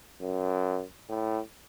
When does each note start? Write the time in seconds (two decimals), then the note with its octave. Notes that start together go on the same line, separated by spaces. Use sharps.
0.21 F#2
1.09 A2